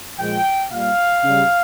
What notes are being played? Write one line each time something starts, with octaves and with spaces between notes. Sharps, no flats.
A#2 F3 G#3 G5
A#2 G3 F5
C#3 G3